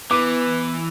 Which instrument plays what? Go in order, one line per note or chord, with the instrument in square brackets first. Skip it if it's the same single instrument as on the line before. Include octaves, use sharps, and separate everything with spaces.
[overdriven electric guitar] E3 [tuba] B3 [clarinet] B4 [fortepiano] D6